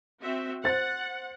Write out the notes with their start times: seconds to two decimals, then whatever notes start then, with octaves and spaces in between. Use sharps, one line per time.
0.22 C4 F#4 E5
0.64 C5 F#5 A6